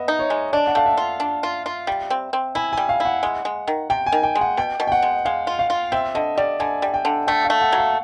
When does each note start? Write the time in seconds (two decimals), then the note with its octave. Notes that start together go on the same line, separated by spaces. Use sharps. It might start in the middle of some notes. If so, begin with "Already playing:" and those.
Already playing: B3 D#5 E5
0.08 D#4
0.19 C#5
0.30 G#3
0.53 D4 D5
0.67 F#5
0.75 A3 F5
0.86 E5
0.97 F4
1.20 D4
1.43 F4
1.66 F4
1.87 G3
2.10 C4
2.33 C4
2.55 E4 G#5
2.73 G3 G#5
2.89 F5
3.00 E4
3.05 F#5
3.23 G#3
3.45 G#3
3.68 D#3
3.90 C3 G5
4.06 G#5
4.12 D#3
4.23 G5
4.35 G#3
4.41 F#5
4.57 B2 G5
4.80 B2
4.87 G5
4.92 F#5
5.02 G#3
5.25 G#3 F5
5.47 F4
5.59 F5
5.70 F4
5.92 C4 E5
6.15 D3 D#5
6.38 G3 D5
6.60 D3 G#5
6.82 G3
6.94 G5
7.05 D3
7.27 A3 G5
7.45 F5
7.50 A3
7.62 F#5
7.72 F#3
7.78 F5